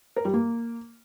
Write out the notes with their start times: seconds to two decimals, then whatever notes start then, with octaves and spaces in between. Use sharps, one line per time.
0.16 A#4
0.25 G3
0.33 A#3